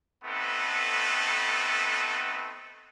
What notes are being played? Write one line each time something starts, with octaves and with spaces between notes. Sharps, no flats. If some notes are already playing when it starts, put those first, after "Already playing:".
A3 B3 C4 D#4 A4 B4